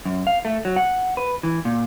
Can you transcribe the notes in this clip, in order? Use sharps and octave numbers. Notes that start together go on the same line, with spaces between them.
F#2
F5
A3
F#3
F#5
B4
E3
A#2